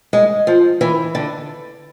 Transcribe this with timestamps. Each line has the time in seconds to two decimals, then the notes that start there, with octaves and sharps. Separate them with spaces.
0.13 G#3
0.47 F3
0.81 E3
1.15 D3